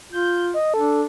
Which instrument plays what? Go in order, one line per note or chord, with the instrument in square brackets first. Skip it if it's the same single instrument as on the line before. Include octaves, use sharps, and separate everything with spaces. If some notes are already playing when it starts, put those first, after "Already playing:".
[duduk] F4 [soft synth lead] G6
[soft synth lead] D#5
[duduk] D4 [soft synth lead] A4